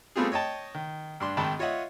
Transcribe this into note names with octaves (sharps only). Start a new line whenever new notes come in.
G3 A3 B3 C4 F4 G#4
C#5 D#5 G5 A5
D#3
G2 D4 C6
G#1 D#3 G5 A5 B5
F4 C#5 D#5 E5 F#5